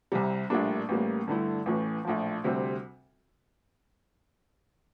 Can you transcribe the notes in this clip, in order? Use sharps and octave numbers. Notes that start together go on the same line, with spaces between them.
C2 C3 G3
A#1 A2 G3 A#3 D4
A1 A2 G3 A#3
G2 D3 A3 E4
A1 A2 E3
A#1 A2 F3
D2 C3 G3 C4